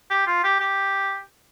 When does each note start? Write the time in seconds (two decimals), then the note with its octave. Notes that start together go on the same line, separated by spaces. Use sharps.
0.10 G4
0.27 F4
0.44 G4
0.60 G4